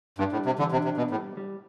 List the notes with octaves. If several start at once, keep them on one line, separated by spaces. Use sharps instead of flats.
G2 D4
A2
G3
C3
D3 E3
C3
D4
C3
B2 B3
A2
G3
G3